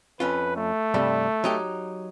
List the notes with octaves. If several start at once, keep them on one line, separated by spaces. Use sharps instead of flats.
F2 C#4 F4 B4
A3
G2 C3 G3
F#3 D#4 G4